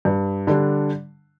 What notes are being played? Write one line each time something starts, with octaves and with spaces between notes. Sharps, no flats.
G2
D3 G3 D4